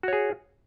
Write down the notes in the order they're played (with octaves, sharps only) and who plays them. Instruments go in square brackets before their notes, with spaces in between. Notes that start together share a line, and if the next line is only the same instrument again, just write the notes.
[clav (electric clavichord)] F#4
C#5
G#4